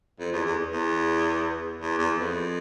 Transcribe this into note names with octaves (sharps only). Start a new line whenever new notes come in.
F2
E2
E2
E2
E2
E2
F2